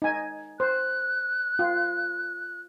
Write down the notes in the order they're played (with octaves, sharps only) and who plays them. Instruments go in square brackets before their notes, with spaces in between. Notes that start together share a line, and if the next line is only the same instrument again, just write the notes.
[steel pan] D#4 G#5
[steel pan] C5 [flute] F#6
[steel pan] F4